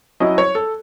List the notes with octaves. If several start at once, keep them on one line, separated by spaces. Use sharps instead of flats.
F#3 C#4 E4 D#5
C#5
A4